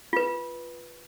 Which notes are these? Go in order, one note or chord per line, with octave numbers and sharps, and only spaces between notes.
F4 B4